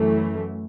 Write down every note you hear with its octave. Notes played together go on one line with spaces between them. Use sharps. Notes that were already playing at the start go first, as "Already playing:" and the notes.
Already playing: F#2 E3 A3